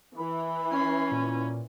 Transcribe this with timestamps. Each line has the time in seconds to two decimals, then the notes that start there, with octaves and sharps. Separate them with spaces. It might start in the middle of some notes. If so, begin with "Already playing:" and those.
0.17 E3 B5
0.72 C#4 C7
1.12 A#2